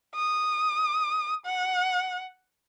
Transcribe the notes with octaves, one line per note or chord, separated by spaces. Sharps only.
D#6
F#5